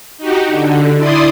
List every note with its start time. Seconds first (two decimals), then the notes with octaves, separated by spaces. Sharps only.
0.18 D#4 F#4 G4
0.48 D3
0.97 E4 D5 C6 D#6